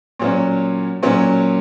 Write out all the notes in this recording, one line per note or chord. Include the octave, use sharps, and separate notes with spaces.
A#2 F#3 C#4
A#2 F#3 C#4